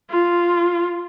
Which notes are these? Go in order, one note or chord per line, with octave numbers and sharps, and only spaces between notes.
F4